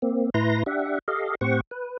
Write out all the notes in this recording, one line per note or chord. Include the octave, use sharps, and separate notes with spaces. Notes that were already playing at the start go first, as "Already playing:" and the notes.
A#3 C4
A2 E4 B4 A#5 C6 A#6
D4 G4 E5 F#5
G4 A4 D#5 F5
A2 C4 G4 C5 F#5 C#6
B4